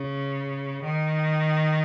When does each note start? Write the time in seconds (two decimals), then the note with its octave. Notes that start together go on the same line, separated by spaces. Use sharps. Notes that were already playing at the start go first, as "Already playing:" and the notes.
Already playing: C#3
0.83 D#3